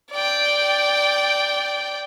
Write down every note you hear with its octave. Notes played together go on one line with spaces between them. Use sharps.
D5 G5